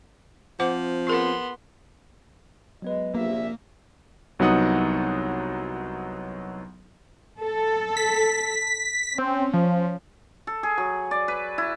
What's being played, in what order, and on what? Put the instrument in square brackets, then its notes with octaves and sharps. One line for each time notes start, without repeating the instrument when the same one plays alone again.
[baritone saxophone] F3 [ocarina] C4 [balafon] C5 F#5 D6
[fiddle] B3 C6 [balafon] F4 G#4 A#4
[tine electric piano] F#3 B3 B4 [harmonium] G#3
[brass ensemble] A#1 E5 [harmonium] C3 [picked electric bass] A#3
[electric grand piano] C2 F#3 B3 D#4 F#5 D#6
[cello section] A4
[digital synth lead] B6
[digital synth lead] C4 [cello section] C#4
[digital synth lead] F3
[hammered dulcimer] A4
G#4
F#3
D5
B4
E4